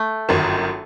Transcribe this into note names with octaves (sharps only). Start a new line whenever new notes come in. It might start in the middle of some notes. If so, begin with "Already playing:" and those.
Already playing: A3
G1 F#2 D#3